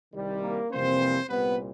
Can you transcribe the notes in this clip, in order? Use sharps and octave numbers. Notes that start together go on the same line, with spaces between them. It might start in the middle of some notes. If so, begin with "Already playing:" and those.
C2 C3 D#3 G3
A#3 A#4
F2 C3 E3 G3 A#3 C4 C5
C2 A#2 G3 B3 C4 B4